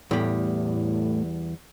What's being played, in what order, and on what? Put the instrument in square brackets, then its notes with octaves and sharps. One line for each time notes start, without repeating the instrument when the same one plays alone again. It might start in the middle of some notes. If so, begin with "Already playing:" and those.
[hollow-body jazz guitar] E2 G3 [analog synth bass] A2